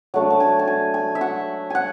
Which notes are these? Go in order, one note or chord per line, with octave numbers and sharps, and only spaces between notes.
F#3 A3 D4 F#5
A5
G#5
A5
G#5
G#5
E5
F#5
F#5 G#5